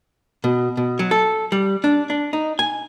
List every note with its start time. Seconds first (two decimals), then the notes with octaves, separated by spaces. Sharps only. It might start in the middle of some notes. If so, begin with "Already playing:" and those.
0.44 B2
0.77 B2
0.99 F#3
1.11 A4
1.52 G3
1.84 D4
2.10 D4
2.33 D#4
2.59 G#5